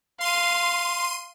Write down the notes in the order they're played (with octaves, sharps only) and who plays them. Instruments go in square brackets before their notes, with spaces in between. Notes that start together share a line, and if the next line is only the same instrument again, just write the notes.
[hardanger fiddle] F5 [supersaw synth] C6 D#7